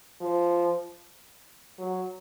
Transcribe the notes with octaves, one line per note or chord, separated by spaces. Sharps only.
F3
F#3